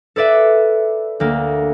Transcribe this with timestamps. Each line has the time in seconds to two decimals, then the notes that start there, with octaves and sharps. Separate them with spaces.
0.16 A4 B4 D5 E5
1.20 D2 A#3